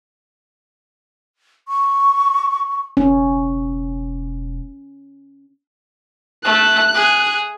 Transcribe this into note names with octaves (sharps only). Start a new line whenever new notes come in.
C#6
E1 C#4
A3 F#6
G#4